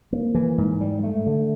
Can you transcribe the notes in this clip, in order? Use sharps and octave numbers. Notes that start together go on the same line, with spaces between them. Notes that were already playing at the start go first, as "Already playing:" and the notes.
A#3
E3
G#2
G3
A3
D3